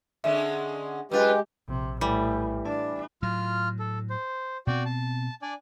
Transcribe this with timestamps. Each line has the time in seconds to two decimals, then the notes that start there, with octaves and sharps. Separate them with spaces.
0.24 D3 G#3 C#4 E5
1.11 F#2 G#3 F4 G4 B4
1.69 A#1 C3
2.01 A2 E3 G3
2.66 D4 A5
3.22 A2 F#3 F4 F6
3.79 A4
4.10 C5
4.67 B2 C4 F#4 D5 G5
4.85 A5
5.42 D4 D5 G#5